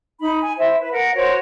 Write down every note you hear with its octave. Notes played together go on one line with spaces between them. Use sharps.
D#4 B5
G#5
E4 C5 E5
B4
A#4 F#5
F#4 A#4 C5 C#5